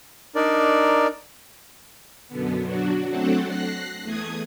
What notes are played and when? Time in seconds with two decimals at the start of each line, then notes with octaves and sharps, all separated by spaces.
0.35 D4 D#4 A#4 D5
2.28 F#2 B2 D3 B3
2.62 F#3 D4 F#4
3.09 F#3 A3 C4 D4 A4 F#5
3.46 F#6 A#6 C7
4.02 E2 A3 D#6 G#6